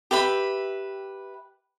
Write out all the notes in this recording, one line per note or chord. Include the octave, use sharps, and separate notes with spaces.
G4 B4 E5 B5